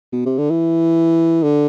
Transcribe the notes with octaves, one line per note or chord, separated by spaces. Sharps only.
B2
C3
D3
E3
D3